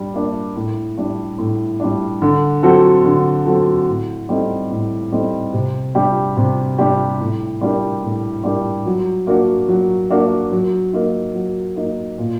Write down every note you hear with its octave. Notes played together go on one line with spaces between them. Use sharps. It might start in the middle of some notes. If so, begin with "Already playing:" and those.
Already playing: G3 D4
A#3 D4
A2
G3 D4
A2
G3 D4
D3
F#3 C4 F#4 A4
D3
F#3 C4 F#4 A4
A2
G3 C4 D#4 A4
A2
G3 C4 D#4 A4
C3
G3 D4 G4
C3
G3 D4 G4
A2
G3 D4 G4 A#4
A2
G3 D4 G4 A#4
F#3
A#3 D4 F#4
F#3
A#3 D4 F#4
F#3
A#3 D#4
F#3
A#3 D#4
A#2